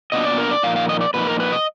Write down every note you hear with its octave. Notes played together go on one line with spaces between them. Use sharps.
A#2 F#3 B3 D4 D#5
D5
A#4
D5
A#2 F3 A#3 D#4 F5
F5
D#5
D5
A#2 F3 A#3 D#4 B4
A#4
B4
D#5